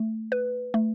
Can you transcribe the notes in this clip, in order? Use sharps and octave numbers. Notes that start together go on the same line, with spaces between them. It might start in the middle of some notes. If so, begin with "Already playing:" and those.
Already playing: A3
B4
A3